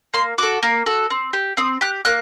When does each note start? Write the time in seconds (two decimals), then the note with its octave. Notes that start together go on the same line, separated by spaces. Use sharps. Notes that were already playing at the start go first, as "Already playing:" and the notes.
0.14 A#3 C6
0.38 F#4 A4 D6
0.63 A#3
0.86 F#4 A4
1.10 C4
1.33 G4
1.57 C4 D#6
1.81 G4 F#6
2.05 A#3 F#6